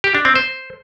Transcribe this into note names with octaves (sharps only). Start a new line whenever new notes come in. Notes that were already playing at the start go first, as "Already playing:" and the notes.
G4
D4
C4
C5